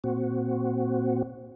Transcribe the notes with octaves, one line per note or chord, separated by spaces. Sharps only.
A#2 C4 F#4